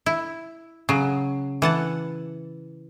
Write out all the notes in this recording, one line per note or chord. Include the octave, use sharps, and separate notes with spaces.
E4
C#3 F#3
E3 F#5 A5